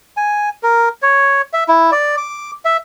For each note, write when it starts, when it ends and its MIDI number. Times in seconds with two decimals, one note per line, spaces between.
0.17 0.49 80
0.63 0.89 70
1.02 1.42 73
1.53 1.64 76
1.68 1.91 64
1.92 2.16 74
2.17 2.51 86
2.65 2.77 76